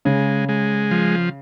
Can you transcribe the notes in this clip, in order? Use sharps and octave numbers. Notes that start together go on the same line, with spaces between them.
C#3 G#3
G#3
F3